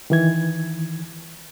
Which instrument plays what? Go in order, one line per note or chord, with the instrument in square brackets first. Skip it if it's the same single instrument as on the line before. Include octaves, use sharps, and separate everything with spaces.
[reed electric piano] D#3 E3 G#6